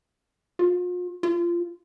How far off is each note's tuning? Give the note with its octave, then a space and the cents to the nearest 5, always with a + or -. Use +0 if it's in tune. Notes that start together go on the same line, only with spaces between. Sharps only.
F4 +40
F4 -20